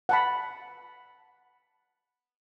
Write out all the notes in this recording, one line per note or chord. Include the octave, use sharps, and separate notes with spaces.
F#5 A5 B5